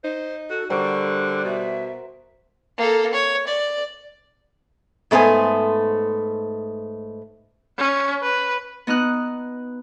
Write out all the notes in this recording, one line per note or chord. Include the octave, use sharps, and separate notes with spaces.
D#4 C5
F#4 A4
D3 G3 F#4 A#4 C5 C#6
B2 E5
A#3 A4
C#5
D5
G#2 A3 B3 C5 G#5
C#4
B4
B3 D#4 D#6 F6 F#6